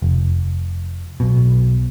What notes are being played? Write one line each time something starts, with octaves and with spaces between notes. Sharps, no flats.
F1
B1 B2